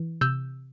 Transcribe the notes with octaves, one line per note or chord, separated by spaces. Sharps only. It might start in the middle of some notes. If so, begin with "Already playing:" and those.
Already playing: E3
C3 E6 G6